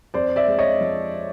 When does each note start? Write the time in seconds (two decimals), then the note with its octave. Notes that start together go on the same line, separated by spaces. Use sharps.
0.14 F2 C5 D5
0.36 D5 E5
0.47 G#3
0.59 C#5 D#5
0.81 F3